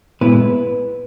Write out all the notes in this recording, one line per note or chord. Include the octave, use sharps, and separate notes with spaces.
A#2 G#3 B3 E4 B4